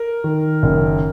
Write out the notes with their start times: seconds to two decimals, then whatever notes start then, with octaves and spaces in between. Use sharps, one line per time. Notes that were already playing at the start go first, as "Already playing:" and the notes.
Already playing: A#4
0.24 D#3
0.63 F#1